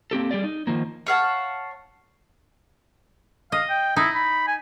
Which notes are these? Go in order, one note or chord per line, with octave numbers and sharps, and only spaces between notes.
A#3 C4 G4 A4
G3 G4 G#4 D5
D#4
D#3 F3 A#3
C#5 F5 F#5 A5
D#5 F5
G5
D#4 E4
B5
G#5